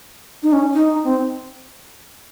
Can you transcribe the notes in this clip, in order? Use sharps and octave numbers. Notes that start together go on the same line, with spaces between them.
D#4
C#4
D#4
C4